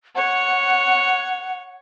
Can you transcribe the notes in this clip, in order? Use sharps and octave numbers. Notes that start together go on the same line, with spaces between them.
C#5 F#5